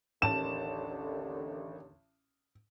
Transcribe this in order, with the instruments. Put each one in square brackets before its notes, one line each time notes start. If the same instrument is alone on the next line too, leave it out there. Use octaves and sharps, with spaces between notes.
[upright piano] A1 A5 [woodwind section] D#2 D3 [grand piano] E7